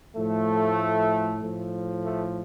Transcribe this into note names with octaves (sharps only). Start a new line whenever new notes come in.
A2 F3 A3
A2 F3
A3